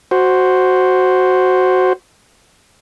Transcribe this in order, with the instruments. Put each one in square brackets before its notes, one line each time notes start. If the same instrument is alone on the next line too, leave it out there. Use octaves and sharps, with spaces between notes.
[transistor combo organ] F#4 C5